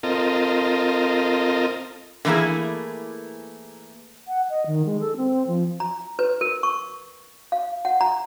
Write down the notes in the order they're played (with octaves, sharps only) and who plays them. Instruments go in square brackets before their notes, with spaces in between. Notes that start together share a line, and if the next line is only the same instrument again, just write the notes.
[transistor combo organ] C4 F4 A4 A#4 D#5
[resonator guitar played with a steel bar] D3 E3 A3 A#3 E4 G#4
[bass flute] F#5
D#5
D#3
G#3
A4
C4
F3
[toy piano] A#5
B4
A#4
C#6
F5
F#5
A#5